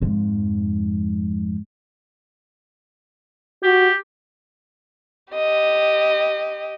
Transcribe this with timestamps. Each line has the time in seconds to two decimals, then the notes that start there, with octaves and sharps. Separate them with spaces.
0.02 F2 G#2
3.63 F#4 G4
5.34 G4 D#5